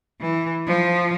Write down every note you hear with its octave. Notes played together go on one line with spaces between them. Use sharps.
E3
F3